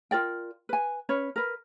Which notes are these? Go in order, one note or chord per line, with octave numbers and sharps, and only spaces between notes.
F4 A#4 D5 G5
B4 G#5
C#4 B4 C#5
A#4 B4